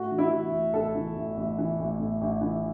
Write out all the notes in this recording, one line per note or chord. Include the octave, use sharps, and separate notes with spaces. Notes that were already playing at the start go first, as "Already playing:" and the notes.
Already playing: A2 F#4
E3
E4
E3
A1
A1 A4
E3
A1
A1
E3
A1
A2
A1
E3